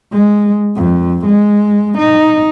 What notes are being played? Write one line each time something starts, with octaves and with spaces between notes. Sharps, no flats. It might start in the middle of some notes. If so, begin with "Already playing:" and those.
G#3
F2
G#3
D#4